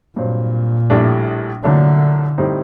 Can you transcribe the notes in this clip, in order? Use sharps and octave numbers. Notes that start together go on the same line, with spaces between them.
G2 A#2 F#3 C4
A#1 A2 G3 D4
C2 A#2 D3 F#3 A3 D4
A2 G3 C4 D#4